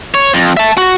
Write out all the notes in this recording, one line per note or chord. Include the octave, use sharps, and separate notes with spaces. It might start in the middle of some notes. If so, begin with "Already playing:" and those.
C#5
F2
E5 A5
F#4